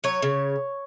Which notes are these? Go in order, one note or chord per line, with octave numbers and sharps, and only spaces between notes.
F#3 C#5
C#3